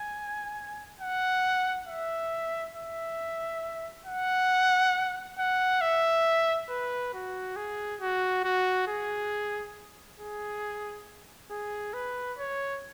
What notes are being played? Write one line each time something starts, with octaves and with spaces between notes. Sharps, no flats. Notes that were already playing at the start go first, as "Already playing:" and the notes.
Already playing: G#5
F#5
E5
E5
F#5
F#5
E5
B4
F#4
G#4
F#4
F#4
G#4
G#4
G#4
B4
C#5